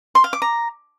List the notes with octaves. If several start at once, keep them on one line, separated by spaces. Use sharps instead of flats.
C6
F5
D6
A#5